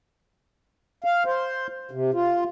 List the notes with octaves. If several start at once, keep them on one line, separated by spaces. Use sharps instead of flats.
F5
C5
C3
F4